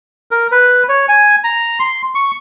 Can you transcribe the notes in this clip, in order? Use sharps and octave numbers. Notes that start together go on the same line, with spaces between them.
A#4
B4
C#5
G#5
A#5
C6
C#6